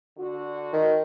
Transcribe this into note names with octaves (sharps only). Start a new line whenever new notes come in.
D3 F#4
D#3